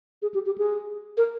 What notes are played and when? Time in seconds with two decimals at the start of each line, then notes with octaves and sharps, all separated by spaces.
0.22 G#4
0.34 G4
0.46 G4
0.58 G#4
1.17 A#4